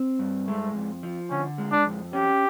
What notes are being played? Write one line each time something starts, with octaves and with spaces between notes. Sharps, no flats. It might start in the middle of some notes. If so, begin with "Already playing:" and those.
Already playing: C4
G2
G#3 A3
F2
F3
D3 C#4
G#3
D4
F2
C#4 G4